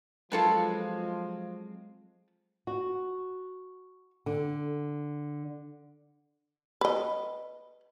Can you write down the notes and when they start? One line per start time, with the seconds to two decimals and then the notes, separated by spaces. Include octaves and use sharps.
0.32 F3 F#3 G#3 C4 F4 A4 B4 A5
2.67 F#4
4.26 D3
6.81 B4 D#5